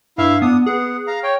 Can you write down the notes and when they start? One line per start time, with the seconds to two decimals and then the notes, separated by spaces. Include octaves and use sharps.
0.18 G2 E4 E5 F5
0.42 B3 D4 D#6
0.66 B3 G#4 F#5
1.07 F5 A#5
1.23 C#5 G5